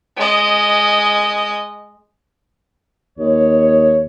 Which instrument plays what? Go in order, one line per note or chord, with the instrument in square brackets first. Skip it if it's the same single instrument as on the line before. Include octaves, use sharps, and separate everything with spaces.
[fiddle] G#3 D#5
[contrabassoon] D#2 [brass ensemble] C#5